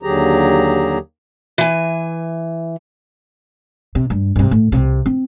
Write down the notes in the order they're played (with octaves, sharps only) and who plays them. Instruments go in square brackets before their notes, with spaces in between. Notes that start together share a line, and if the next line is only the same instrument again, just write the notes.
[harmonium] D#2 D3 F#3 G4 G#4 A#5
[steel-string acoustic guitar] E3 G#5
[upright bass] C3
G2
G2 C3
A2
C2 C3
C4